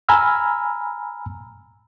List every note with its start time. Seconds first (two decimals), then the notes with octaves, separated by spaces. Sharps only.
0.09 G#5 A#5 B5 E6 F6